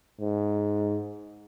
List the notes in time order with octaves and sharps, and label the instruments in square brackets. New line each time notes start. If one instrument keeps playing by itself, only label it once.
[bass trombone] G#2